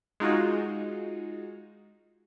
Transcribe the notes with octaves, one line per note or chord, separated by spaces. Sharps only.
G#3 D#4 F4 F#4